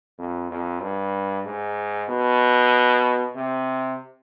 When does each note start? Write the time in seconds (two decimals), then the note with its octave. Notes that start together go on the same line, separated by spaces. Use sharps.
0.19 F2
0.51 F2
0.82 G2
1.46 G#2
2.09 B2
3.36 C3